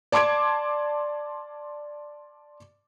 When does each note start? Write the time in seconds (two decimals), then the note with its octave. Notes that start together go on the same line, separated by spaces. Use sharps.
0.12 D5 A5 C6 D6 G#6 D7